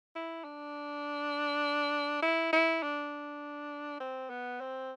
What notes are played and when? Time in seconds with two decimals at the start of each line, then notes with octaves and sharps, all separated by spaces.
0.15 E4
0.44 D4
2.22 E4
2.53 E4
2.83 D4
4.00 C4
4.30 B3
4.61 C4